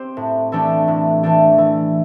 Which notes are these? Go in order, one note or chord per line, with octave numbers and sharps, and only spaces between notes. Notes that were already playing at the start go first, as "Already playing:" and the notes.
Already playing: C4 G4 C5
A2
E3 A3 D4 G4
A2
E3 A3 D4 G4
E3